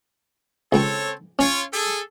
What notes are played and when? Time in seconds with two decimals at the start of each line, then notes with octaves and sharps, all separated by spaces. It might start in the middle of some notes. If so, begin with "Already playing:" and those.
0.72 C#2 C4 A4 C#5 G5
1.39 C#4 F4 C#5
1.73 G#4 A4